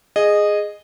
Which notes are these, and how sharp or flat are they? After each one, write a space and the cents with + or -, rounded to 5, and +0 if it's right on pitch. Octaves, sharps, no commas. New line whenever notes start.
G#4 +0 D#5 -15